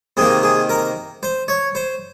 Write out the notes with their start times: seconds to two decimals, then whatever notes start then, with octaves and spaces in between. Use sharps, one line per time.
0.17 C3 D#3 A#3 G#4
0.43 G#4
0.69 A#4
1.23 C5
1.48 C#5
1.75 C5